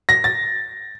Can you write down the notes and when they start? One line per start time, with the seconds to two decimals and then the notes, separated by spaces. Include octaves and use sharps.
0.09 A#6
0.24 A6